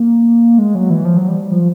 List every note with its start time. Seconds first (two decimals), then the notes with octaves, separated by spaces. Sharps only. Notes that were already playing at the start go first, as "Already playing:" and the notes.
Already playing: A#3
0.58 G#3
0.75 F#3
0.90 E3
1.05 F3
1.17 F#3
1.28 G3
1.52 F3